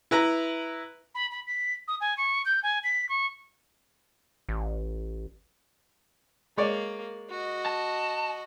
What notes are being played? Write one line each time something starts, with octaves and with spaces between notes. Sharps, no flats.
E4 B4 A#5
B5
B5
B6
D#6
G#5
C#6
G6
G#5
B6
C#6
A1
G#3 A#3 C#5 D5
F#4 D#5
A5